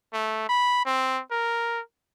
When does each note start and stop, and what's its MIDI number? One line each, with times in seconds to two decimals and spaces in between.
0.13 0.45 57
0.49 0.81 83
0.86 1.21 60
1.31 1.81 70